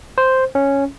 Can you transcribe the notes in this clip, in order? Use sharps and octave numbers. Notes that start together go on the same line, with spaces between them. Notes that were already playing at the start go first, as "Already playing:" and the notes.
C5
C#4